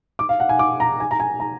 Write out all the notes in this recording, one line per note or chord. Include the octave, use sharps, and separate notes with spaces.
D6
F5
F#5
G#5
D6
A#5
G#5
A#5
G#5
A#5